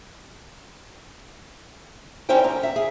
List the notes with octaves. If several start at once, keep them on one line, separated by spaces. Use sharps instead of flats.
G3 C#4 D#4 E4 C5 G5
D2 A#5
E5
G#4